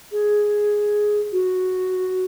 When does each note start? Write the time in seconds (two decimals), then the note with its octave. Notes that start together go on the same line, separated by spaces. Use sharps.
0.12 G#4
1.32 F#4